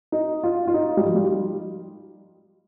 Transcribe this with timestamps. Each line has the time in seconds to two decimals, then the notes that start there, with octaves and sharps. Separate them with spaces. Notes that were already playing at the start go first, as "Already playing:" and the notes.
0.12 D#4
0.44 F4
0.67 F4
0.74 D#4
0.97 G3
1.05 F3
1.15 G3